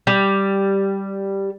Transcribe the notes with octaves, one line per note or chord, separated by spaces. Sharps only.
G3